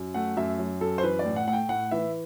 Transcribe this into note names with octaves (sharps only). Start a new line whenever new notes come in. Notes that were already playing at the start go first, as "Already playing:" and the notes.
Already playing: F#2
A3 F#5
F#2 E5
F#3
F#2 A4
C5
E3 B4
D5
A2
F#5
A3 F#5
G5
A2 F#5
E3 E5